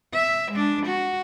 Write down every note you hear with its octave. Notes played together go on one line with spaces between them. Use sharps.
E5
G#3 D4
F#4